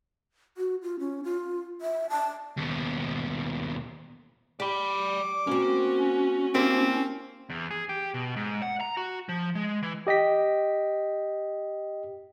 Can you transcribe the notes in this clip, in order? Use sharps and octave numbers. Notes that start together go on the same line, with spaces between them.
F#4
F4
C#4
F4
E5
A5
D#2 B2
G4 D5 B5 D6
A#3 C4 C#4 F#4
A#3 C4 E4 G4
E2
G#4
G4
B2
G#2
F#5
A#5
F#4
F3
G#3
E3
G4 D#5 G5 B6